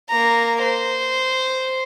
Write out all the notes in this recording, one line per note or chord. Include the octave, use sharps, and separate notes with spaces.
A#3 A#5
C5